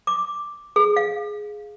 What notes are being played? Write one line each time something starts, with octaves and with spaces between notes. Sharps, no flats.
D6
G#4
F5